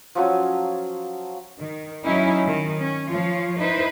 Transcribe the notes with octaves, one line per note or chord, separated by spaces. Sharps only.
F3 F#3 C#4
D#3
F#3 C#4 D#4 E4
D#3
C#4
F3 F4 C#5
D#4 E4 B4 C5